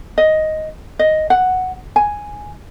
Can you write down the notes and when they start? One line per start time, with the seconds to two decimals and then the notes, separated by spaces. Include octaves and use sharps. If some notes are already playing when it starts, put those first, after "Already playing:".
0.18 D#5
0.99 D#5
1.30 F#5
1.96 G#5